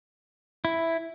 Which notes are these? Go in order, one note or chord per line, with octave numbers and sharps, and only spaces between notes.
E4